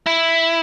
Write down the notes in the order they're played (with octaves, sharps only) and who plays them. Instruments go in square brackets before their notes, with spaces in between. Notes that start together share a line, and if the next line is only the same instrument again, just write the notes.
[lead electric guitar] E4